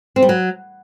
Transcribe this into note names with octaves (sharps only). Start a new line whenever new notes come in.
C4
G3
F#3